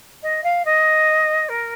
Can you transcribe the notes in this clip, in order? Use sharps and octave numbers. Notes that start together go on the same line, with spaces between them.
D#5
F5
D#5
A#4